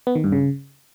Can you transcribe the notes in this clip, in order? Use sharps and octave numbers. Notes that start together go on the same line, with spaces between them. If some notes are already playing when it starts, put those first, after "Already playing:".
B3
D#3
G2
C#3